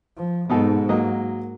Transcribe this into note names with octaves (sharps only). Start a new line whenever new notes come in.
F3
G#2 B2 D#4 A4
F#3 A#3 D#5